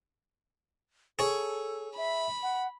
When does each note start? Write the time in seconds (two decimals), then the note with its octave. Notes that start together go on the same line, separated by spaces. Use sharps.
1.19 G#4 A4 C#5
1.97 E5 B5
2.43 F#5